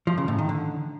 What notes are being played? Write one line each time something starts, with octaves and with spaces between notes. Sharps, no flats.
F3
C#3
A2
D#3
D3